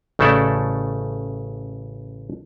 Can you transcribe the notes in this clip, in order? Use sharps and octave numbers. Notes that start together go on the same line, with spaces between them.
A1 C#3 A3 E4 A4 D5